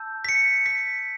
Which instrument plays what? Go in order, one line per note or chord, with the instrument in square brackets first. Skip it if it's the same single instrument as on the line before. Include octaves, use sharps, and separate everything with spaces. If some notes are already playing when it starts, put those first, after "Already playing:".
Already playing: [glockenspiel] A5 E6 G6
B6
C#7
B6